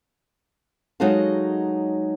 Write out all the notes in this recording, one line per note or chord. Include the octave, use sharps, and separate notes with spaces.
F#3 G#3 D#4 F#4 A4 F5